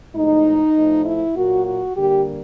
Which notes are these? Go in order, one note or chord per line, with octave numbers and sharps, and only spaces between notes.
A2 F3 G#3 D#4
A2 F3 A3
E4
A#2 F#3 A#3 F#4
F#4
D3 G3 A#3 G4